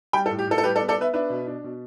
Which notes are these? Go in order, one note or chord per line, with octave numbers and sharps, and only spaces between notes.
G3 G5 B5
A4
A2
G4
A2 A4
A4
G3 G4 B4
A4 D5
B3
A4 D5
B3 B4 E5
D4 B4 E5
B2
D4
B2